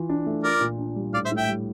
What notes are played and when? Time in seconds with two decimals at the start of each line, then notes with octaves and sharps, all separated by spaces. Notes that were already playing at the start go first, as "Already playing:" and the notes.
Already playing: E3 F4
0.10 D4
0.26 A3
0.43 F4 A#4 D5
0.61 A#2
0.78 D4
0.96 G3
1.13 A2 D5 F5
1.25 C5 E5
1.32 A2
1.37 E5 G5
1.49 G3